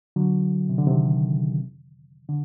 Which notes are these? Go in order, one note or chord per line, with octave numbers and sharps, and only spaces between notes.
D3 F#3
C3
D3
C3 D#3
D3